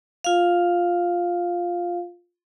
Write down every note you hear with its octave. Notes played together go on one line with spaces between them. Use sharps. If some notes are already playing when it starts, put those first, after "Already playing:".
F4 F5